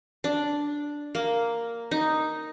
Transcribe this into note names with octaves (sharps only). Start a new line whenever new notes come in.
D4
A#3
D#4